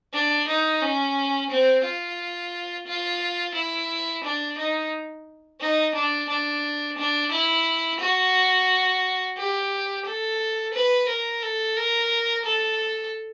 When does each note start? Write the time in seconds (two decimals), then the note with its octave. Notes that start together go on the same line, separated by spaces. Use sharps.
0.13 D4
0.48 D#4
0.82 C#4
1.50 C4
1.85 F4
2.87 F4
3.55 E4
4.24 D4
4.58 D#4
5.60 D#4
5.95 D4
6.29 D4
6.98 D4
7.31 E4
8.00 F#4
9.37 G4
10.05 A4
10.74 B4
11.08 A#4
11.42 A4
11.76 A#4
12.45 A4